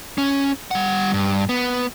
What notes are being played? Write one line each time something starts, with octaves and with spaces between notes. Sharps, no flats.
C#4
G3 F#5
G2
B3